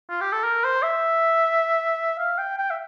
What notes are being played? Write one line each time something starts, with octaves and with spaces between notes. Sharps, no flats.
F4
G4
A4
A#4
C5
E5
F5
G5
G5
E5